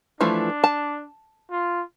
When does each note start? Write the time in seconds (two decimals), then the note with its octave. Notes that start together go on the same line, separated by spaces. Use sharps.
0.21 E3 F3 A3 D4
0.64 A5
1.50 F4